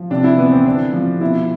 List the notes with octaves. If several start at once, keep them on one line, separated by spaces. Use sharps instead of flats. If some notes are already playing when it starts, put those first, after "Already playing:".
Already playing: F3
C3 D4
E4
E3 B3
C4
D3 D4
F3
B2 E4